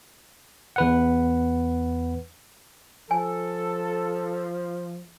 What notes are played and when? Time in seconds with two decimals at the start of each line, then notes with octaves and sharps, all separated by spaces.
0.76 E2 B4 F#5
3.11 F3 A4 G#5